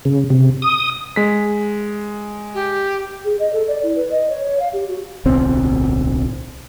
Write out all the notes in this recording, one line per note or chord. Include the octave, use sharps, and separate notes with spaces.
C#3
C3
D#6
G#3 B6
G4
G#4
D#5
A4
D5
E4
B4
D#5
C#5
C#5
F5
G4
F#4
D1 B1 C4